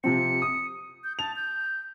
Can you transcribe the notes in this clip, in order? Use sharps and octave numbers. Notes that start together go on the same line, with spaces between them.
C3 F3 C4 C#7
D#6
G6
A5 F7
G6